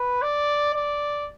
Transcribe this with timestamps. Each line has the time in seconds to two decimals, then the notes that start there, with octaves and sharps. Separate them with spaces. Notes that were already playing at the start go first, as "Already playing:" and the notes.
Already playing: B4
0.22 D5
0.74 D5